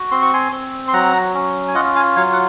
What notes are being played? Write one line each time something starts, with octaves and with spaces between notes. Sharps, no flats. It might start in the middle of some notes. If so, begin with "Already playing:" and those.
Already playing: F#4
C4 C6
C#6
G#5 C6
C4
C6
F#3 F#5 A#5
C#4
G#5
F4 D#5 F#5
F5 G#5
F#3 C#5 F5
F#5